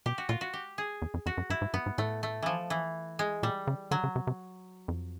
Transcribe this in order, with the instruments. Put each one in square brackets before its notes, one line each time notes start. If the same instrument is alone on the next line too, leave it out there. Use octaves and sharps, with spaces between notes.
[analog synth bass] B2 [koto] G4
[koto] F#4
[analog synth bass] A#2 [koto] F4
[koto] F#4
G4
G#4
[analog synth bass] E2
F2
[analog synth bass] F2 [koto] F#4
[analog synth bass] F#2
[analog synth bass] G2 [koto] E4
[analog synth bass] G#2
[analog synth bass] G2 [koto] B3
[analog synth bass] G#2
[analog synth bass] A2 [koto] A3
[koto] A3
E3 F3
E3
G#3
[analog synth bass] A#2 [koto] G3
[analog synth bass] C#3
[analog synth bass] D3 [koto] F#3
[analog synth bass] C#3
C3
C3
F2